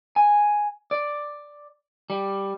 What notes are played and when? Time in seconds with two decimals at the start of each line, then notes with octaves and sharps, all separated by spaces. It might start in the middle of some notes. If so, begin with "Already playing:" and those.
0.16 G#5
0.91 D5
2.10 G3